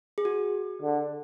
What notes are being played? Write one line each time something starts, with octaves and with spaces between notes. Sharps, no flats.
G#4
F#4
D3